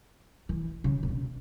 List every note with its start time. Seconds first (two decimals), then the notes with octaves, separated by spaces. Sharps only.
0.49 E3
0.84 C#3
1.03 C#3
1.08 B2